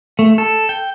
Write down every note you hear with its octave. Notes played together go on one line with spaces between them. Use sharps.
A3
A4
G5